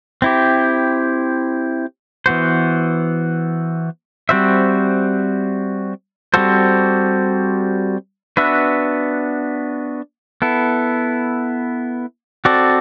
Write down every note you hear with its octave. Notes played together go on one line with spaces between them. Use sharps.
C4 E4 G4
E3 B3 F#4 C5
G3 C4 F#4 C5 E5
G3 C4 F#4 A4 C5
B3 D4 F#4 B4 E5
B3 E4 A4
C4 F#4 A4 D5